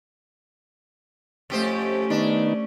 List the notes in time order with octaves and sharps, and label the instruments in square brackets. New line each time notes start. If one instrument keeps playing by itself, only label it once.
[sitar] F2 G4 C5 [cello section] A3 C#4
[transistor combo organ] D#3 B3 D#4 [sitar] D4